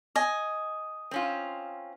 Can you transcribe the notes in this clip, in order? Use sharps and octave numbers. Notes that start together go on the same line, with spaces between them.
D#5 G#5
C4 C#4 F4